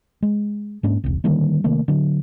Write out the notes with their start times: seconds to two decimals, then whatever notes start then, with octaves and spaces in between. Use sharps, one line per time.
0.22 G#3
0.83 G#2 A#3 C#4 D4
1.04 E1 C2
1.24 D3 D#3 G3 A#3
1.64 C3 D#3 A3 A#3
1.88 D3 F#3